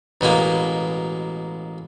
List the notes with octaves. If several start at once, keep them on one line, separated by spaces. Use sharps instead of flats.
A1 B2 G#3 A#3